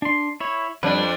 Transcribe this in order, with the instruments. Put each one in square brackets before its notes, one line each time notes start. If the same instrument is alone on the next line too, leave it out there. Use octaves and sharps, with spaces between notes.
[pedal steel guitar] D4 C6
E4 C#5
[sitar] F2 D4 [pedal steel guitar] G3 B4